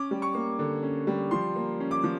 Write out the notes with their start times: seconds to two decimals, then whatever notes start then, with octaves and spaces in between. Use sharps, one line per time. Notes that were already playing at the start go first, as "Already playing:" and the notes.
Already playing: C#4 D6
0.11 G3
0.22 C#6
0.35 A#3
0.59 D3
0.83 C#4
1.07 G3
1.31 F3 C6
1.56 A#3
1.80 C#4
1.91 D6
2.04 F3